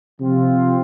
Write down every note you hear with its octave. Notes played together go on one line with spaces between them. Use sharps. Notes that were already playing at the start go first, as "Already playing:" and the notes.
C3 F3 C4 F4